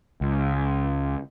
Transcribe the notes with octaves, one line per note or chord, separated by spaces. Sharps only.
C#2